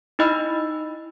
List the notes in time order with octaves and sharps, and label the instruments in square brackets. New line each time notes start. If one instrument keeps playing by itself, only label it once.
[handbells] D#4 E4 D#5 B5 E6